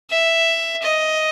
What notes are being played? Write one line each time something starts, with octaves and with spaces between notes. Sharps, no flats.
E5
D#5